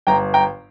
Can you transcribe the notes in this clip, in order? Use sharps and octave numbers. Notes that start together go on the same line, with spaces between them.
G1 G5 A#5
G5 A#5